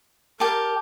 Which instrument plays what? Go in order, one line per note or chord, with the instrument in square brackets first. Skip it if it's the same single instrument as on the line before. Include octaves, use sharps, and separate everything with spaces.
[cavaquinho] G4 A5 [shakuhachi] A#4